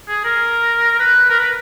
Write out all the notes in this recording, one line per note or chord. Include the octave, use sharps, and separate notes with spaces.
G#4
A#4
B4
A#4
B4